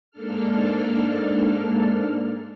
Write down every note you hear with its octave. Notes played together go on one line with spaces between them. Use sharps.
G#2 A#3 D4 A4 F6